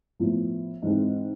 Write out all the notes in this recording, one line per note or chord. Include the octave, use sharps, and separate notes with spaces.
A2 F3 B3 E4
G#2 E3 G#3 C4